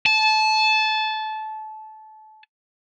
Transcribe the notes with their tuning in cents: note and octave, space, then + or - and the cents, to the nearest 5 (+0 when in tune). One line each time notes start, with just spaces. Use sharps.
A5 -20